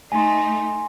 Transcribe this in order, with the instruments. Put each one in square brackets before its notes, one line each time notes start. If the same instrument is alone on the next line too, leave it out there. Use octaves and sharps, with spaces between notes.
[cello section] A3 D#4 [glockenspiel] G#5 C6